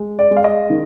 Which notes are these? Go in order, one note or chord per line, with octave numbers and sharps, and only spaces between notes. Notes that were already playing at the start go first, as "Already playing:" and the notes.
Already playing: G#3
D5
G#3
F5
D#5
D#3